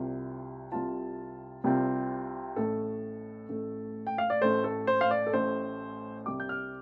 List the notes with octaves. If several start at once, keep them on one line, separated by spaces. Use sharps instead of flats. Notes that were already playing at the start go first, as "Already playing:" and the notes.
Already playing: C2 C3 G3 C4 F4
C2 C3 G3 C4 F4 A5
C2 C3 G3 C4 F4
A1 A2 A3 A4
A1 A2 A3
G5
F5
D5
A1 A2 A3 C5
A4
C5
F5
D5
A4
A1 A2 A3 C5
C2 C3 G3 D6
G6
F6